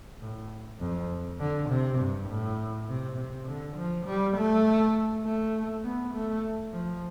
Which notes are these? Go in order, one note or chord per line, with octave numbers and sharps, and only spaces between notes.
A2
F2
D3
C3
G2
A2
C3
C3
D3
F3
G3
A3
A3
B3
A3
F3